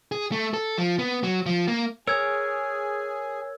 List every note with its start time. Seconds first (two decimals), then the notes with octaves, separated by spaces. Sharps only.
0.12 G#4
0.32 A3
0.54 A4
0.78 F3
0.99 B3
1.23 F#3
1.46 F3
1.68 A#3
2.07 G#4 A#4 C#5 E6 G#6